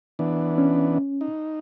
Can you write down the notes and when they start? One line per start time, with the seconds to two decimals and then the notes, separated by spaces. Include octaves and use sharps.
0.19 E3 B3 D4
0.58 C#4
1.21 D#4